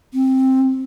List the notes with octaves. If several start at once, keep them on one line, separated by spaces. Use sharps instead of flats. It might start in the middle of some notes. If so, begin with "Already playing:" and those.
C4